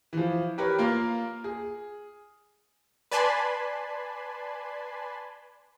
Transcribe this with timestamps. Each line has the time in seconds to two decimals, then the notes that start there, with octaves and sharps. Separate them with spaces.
0.13 E3 F3
0.58 G4 A#4 B4 C#5
0.79 A#3 F4 A#4 F6
1.44 G#4
3.11 B4 D5 G#5 A5 B5 C6